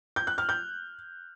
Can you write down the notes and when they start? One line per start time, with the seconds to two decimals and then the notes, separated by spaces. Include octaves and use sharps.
0.16 G6
0.27 F#6
0.38 F6
0.49 G6